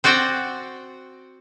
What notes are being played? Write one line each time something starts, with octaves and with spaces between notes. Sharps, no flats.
C4 F#4 D5 F#5 G5